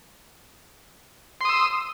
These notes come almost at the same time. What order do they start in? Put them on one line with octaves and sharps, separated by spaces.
C6 D#6 E6